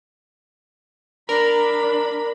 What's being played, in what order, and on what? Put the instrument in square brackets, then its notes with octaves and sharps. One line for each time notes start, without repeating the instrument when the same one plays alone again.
[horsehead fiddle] D4 B5 [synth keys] A#4